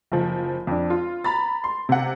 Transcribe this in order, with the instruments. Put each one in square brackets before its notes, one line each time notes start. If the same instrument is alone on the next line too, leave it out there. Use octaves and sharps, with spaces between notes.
[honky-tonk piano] F#1 F3
F2 D4
F4
A#5 B5 A6
C6
C3 F#5